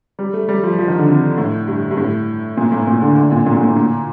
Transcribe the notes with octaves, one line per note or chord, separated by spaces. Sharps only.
G3
A3
G3
F3
F3
D#3
D3
C3
A2
G2
G2
A2
A#2
A2
A#2
D3
D3
A#2
A#2
A#2
A2
A#2